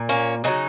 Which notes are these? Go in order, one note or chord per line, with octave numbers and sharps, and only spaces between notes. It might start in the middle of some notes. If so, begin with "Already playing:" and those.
Already playing: A#2
A#3 C#4
C#3 F#3 B3 D#4